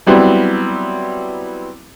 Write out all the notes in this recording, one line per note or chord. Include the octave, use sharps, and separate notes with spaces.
F#3 G3 B3 C4 E4